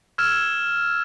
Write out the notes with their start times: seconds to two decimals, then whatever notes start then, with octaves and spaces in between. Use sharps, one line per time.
0.18 E6 F6 G#6 E7